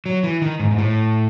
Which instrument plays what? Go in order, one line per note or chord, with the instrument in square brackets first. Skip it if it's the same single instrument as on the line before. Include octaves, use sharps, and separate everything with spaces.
[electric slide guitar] F#3
E3
D#3
G#2
G#2
A2